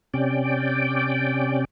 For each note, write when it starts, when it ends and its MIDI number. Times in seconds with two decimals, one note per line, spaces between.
0.14 1.65 48
0.14 1.65 61
0.14 1.65 74
0.14 1.65 79